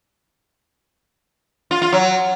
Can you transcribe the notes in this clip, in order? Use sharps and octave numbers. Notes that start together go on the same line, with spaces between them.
F4
F4
F#3